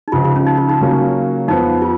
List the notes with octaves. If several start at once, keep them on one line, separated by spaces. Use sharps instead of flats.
D#4
C#2 C#3 F3 F4
F4
C#4
D#4
F4
D#4
C#3 F#3 A#3 C#4
F2 F3 B3 D#4
F4